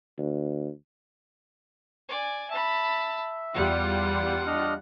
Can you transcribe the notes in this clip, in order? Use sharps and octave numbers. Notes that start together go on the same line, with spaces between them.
D2
D5 G#5
E5 A5 B5
E2 G3 F4 F#5
D4 D#5 F6